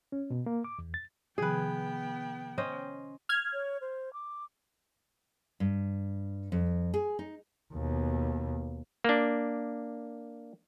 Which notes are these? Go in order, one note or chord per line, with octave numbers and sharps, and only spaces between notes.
C#4
B2
A#3
D6
E2
A6
C3 D#3 F3 B3 G#4 B4 G5
C#4 C5 D#5
F6 G#6
C#5
C5
D6
G2
F2
G#4
D#4
D#2 B2
A#3 D4